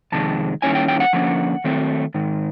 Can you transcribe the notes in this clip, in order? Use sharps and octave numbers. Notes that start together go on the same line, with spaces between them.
F2 C3 D#3 G#3 A5
D#3 G3 A#3 C#4 E4 G#5
G5
G5
F#5
D3 F3 A#3 C#4
D#3 F#3 A3 C4
G#2 D#3